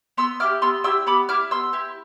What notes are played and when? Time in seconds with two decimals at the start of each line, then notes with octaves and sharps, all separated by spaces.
0.17 B3 C6 E6
0.40 E4 G4 D6 F6
0.62 B3 C6 E6
0.84 E4 G4 C6 E6
1.07 B3 B5 D6
1.29 E4 G4 D6 F6
1.51 B3 C6 E6
1.73 E4 G4